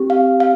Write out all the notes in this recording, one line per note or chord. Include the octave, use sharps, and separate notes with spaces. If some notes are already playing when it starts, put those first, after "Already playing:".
Already playing: C4 G4
F5
F5